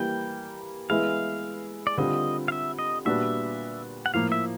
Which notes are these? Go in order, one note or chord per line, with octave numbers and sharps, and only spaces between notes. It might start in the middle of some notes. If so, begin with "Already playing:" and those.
Already playing: E3 G3 A#3 G5
E3 G#3 B3 E4 F5
D5
D3 G3 C4 F4 D#5
F5
E5
D#5
A#2 G3 B3 D4 F#4 E5
F#5
A2 F3 A#3 F5
E5